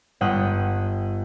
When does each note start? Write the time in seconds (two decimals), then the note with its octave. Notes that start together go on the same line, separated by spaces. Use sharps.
0.21 G1 F#5 G5 D#6 F#6